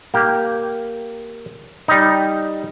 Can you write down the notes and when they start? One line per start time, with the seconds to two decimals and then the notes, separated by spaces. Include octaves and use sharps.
0.14 A#3 G4
1.88 G3 D#4